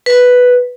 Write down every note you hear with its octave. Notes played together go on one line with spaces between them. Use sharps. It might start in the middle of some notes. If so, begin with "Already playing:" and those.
B4